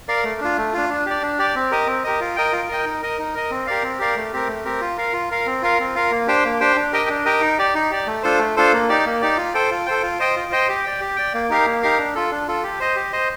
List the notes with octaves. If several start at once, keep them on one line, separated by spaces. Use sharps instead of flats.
A#4 D5 F5
A3
D4 F4
A3
D4 F4
D4
G4 D5
D4
G4 D5
C4
G4 A#4 D#5
C4
G4 A#4 D#5
F4
A#4 D#5 G5
F4
A#4 D#5 G5
D#4
A#4 D#5
D#4
A#4 D#5
C4
G4 A#4 D5 F5
C4
G4 A#4 D5 F5
A3
C4 G4 A#4
A3
C4 G4 A#4
F4
A#4 F5
F4
A#4 F5
C4
F4 A#4 F5
C4
F4 A#4 F5
A#3
D4 G4 C5 G5
A#3
D4 G4 C5 G5
D4
G4 A#4 D#5 G5
D4
G4 A#4 D#5 G5
D#4
G4 D5
D#4
G4 D5
A3
D4 F4 A4 C5
A3
D4 F4 A4 C5
A#3
D#4 G4 D5
A#3
D#4 G4 D5
F4
A4 C5 G5
F4
A4 C5 G5
F4
C5 D#5 G5
F4
C5 D#5 G5
G4
D5 G5
G4
D5 G5
A#3
D#4 G4 A#4 F5
A#3
D#4 G4 A#4 F5
D4
F4 A4
D4
F4 A4
G4
C5 D#5
G4
C5 D#5